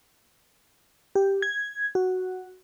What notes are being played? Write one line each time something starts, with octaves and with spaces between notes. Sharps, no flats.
G4
G#6
F#4